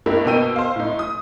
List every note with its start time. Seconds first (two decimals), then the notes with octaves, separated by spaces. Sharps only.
0.06 G2 A#3 D#4 E4 G4
0.25 B2 A#3 D#4 G5 E6 D#7
0.56 C5 F5
0.76 A2 D#4
0.99 D#6